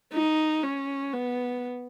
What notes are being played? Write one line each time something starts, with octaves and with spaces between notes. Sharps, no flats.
D#4
C#4
B3